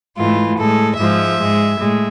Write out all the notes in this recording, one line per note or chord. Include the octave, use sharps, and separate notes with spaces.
G#2 E3 A3 F4
A2 G#3 A4
G#2 F3 G#3 E5
G#2 G#3
A2 G#3